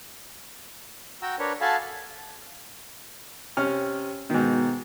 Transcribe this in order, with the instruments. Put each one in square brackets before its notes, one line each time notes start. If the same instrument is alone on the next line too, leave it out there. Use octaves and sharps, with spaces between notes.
[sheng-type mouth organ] F#4 G5 A#5 E6
D4 A#4 B4 C#5
F#4 A4 F5 G#5 A5 B5
[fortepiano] C3 C#4 F6
[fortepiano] G#2 D#3 [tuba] B2